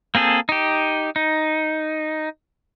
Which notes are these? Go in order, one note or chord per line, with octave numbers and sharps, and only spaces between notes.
A#3 C4 G#4 A4
D#4 G4
D#4